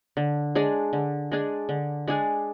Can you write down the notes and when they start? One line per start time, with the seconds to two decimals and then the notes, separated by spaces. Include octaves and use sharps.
0.17 D3
0.55 G#3 D4 G#4
0.93 D3
1.32 G#3 D4 G#4
1.69 D3
2.08 G#3 D4 G#4